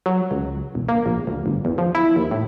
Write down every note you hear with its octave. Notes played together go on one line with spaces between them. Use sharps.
F#3
C#2
E1
A#3
A#1
D2
G1
E2
F3
E4
D#2
A2